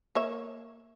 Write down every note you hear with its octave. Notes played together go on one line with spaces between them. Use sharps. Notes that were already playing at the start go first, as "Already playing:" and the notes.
A#3 C#5 E5